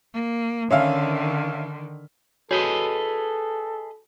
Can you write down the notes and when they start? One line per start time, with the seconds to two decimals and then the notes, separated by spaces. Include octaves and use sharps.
0.14 A#3
0.71 D3 D#3 C#4 E5 F5
2.51 F#4 G#4 A4 B4 C#5 D#5